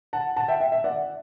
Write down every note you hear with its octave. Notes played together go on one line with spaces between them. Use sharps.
F#5 A5
F#5 A5
E5 G5
E5
E5
D5 F#5